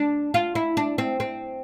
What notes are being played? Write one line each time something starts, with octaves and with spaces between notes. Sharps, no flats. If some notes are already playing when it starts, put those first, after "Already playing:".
Already playing: D4
F4
E4
D4
C4
C4